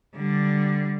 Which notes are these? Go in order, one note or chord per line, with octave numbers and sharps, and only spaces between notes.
D3 G3